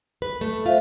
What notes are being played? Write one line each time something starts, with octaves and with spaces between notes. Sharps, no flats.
B4
A3
F4 C5 E5 F5